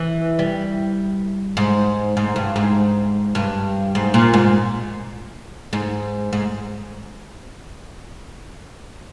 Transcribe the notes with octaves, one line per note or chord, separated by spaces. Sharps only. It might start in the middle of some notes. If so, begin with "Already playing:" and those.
Already playing: E3
G3
G#2
G#2
G2
G#2
G2
G#2
A#2
G#2
G#2
G#2